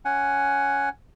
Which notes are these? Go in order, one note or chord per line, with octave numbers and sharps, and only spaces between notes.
C#4 F#5 G#5